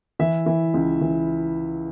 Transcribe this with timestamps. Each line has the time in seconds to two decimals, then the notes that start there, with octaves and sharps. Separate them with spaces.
0.19 E3 E5
0.46 E3
0.74 C#2
1.01 E3